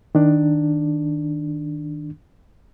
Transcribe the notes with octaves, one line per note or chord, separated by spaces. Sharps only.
D#3 D4